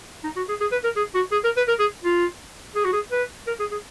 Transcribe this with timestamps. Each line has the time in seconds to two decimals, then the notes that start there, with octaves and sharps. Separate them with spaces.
0.24 D#4
0.36 F#4
0.49 G#4
0.61 G#4
0.72 B4
0.84 A#4
0.96 G#4
1.15 F#4
1.32 G#4
1.44 A#4
1.57 B4
1.68 A#4
1.79 G#4
2.04 F4
2.76 G#4
2.85 F#4
2.93 G#4
3.11 B4
3.47 A#4
3.59 G#4
3.71 G#4